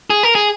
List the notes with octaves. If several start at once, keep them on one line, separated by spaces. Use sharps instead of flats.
G#4
A#4
G#4